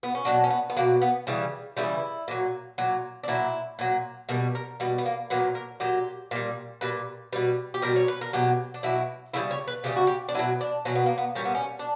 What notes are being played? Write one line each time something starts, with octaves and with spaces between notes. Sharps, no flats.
B3
C#4
B2 F#3 D4
C#4
B3
B3
B2 F#3 A#3
B3
C#3 E3 G3
C#3 E3 G3 E4
A#2 F#3
A#2 F#3
D4
A#2 F#3 E4
A#2 F#3
B2 G3 A#4
A#4
B2 G3 B3
B3
A#3
A#2 F#3 B3
A#4
A#2 F#3 G4
A#2 G3
A#2 G3 B4
B2 G3 B4
G4
B2 G3 A#4
C#5
B4
A#4
B2 F#3 G4
D4
B2 F#3 E4
C#3 E3 G3 E4
C#5
B4
C#3 E3 G3 G4
F#4
G4
D4
B2 F#3 E4
D4
B2 F#3 C#4
B3
A#3
B3
A#2 G3 C#4
B3
C#4
D4